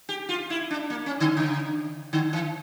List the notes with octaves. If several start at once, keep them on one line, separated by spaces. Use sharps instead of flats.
G4
F4
E4
D4
A#3
C#4
D3
C#3
D3
E3